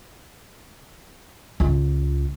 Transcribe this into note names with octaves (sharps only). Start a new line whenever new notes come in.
C#2 F4